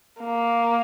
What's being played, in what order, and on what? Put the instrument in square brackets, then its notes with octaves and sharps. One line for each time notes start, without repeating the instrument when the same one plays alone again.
[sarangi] A#3